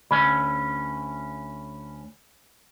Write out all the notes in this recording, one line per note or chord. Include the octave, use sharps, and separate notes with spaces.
D2 C#4 B5